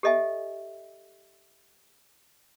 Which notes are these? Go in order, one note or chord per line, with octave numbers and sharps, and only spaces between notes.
G4 A4 D#5 E5 G#5